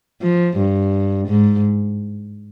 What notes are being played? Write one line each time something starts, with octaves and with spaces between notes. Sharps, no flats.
F3
G2
G#2